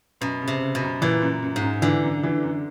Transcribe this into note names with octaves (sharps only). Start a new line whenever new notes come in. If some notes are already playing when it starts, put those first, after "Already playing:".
F#2 B2
C#3
C3
C#3
B2
F#2
A#2 E3
F#2
F#2
G#2
F#2
D3 E3
F#2
E3
F#2